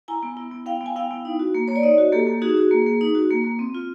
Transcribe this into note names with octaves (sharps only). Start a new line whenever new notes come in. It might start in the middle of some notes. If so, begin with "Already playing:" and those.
E4 G#5 A#5
B3
E4
B3
E4 F5 G5
B3 G#5
E4 F5 G5
B3
D#4
F#4
A#3
A#3 C#5
D5
D#4 C#5 D#5
F#4
A#3 G4 A4
A#3
D#4 F#4 G#4
F#4
A#3
A#3
D#4
F#4
A#3
A#3
C4
F4